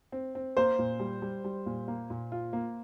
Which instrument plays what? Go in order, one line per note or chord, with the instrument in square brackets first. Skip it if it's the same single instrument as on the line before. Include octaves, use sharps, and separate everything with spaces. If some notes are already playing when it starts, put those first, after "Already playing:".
[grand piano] C4
C4
[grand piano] A#3 [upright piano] C5
[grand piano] A#2
G3
G3
G3
A#2
A#3
A#2
F4
A#3